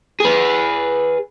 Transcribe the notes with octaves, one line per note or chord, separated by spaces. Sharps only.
G#4 B4